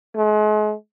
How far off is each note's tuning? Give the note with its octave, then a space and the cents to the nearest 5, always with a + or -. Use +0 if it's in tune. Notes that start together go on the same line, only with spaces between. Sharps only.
G#3 +40